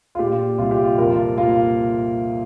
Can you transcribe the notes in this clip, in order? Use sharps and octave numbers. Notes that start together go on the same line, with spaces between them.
F4
A#2 G4
C2 F4
G4
F4
F2 F4 A#4
A#3 F4